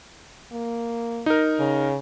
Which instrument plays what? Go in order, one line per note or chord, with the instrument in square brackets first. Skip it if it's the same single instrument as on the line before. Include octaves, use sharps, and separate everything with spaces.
[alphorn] A#3
[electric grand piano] D#4 A#4
[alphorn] C#3